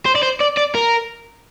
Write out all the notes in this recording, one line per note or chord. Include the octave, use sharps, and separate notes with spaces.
C5
D5
C5
D5
D5
A#4